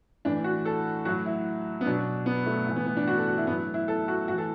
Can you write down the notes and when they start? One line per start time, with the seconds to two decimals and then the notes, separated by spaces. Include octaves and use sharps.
0.25 A2 E3 D4
0.44 F#4
0.65 A4
1.05 A2 F#3 F#4
1.26 E4
1.81 B3
1.86 B2 F#3 D4
2.26 B3
2.46 A3
2.67 A2 E3
2.76 B3
2.86 B3
2.97 D4
3.07 F#4
3.17 A4
3.28 F#4
3.38 E4
3.47 A2 B3
3.51 F#3
3.74 E4
3.88 A4
4.08 F#4
4.28 A2 E3 F#4
4.38 A4